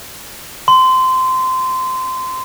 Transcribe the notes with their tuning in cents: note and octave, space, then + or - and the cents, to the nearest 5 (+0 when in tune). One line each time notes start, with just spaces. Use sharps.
C6 -20